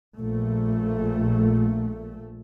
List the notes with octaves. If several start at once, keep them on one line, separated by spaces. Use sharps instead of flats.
A#1 A3